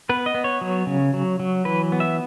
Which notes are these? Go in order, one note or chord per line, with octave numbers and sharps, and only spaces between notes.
B3 B4
D#5
B3
C#5
F#3
C#3
F#3
F#3
E3 B4
B3
E5